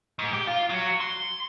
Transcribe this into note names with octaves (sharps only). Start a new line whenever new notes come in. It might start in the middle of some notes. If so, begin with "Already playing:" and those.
G#2
G4
F4
F#3
C6